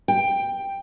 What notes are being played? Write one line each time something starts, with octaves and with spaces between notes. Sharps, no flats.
G5